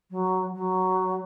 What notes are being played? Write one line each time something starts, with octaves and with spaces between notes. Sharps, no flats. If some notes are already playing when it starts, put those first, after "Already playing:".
F#3
F#3